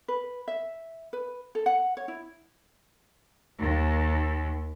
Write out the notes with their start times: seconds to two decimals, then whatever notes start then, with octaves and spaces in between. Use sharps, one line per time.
0.08 B4
0.48 E5
1.13 B4
1.55 A4
1.66 F#5
1.97 C#5
2.08 E4
3.60 D#2